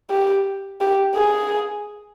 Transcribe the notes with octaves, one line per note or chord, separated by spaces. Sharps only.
G4
G4
G#4